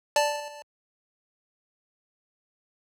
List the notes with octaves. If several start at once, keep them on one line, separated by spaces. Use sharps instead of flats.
D5 A5